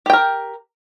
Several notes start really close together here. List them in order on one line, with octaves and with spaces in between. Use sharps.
G4 G5 A#4